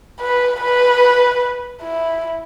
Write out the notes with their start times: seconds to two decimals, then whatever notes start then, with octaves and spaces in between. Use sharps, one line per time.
0.20 B4
0.61 B4
1.82 E4